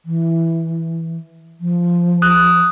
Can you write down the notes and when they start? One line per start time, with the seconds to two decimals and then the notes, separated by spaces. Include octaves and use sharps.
0.05 E3
1.60 F3
2.22 D#6 F#6